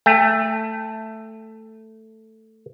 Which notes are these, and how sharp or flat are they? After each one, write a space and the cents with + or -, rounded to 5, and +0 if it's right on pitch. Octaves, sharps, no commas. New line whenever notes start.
A3 +5 G5 +45